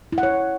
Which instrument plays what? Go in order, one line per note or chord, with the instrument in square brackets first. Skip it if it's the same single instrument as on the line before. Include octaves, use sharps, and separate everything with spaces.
[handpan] E4
F#5
C#5